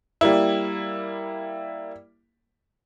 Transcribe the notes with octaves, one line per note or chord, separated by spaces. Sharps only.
G3 A#3 E4